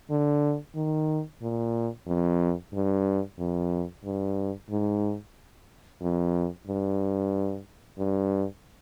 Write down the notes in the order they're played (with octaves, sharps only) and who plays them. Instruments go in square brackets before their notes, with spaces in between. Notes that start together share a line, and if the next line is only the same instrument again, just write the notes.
[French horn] D3
D#3
A#2
F2
G2
F2
G2
G#2
F2
G2
G2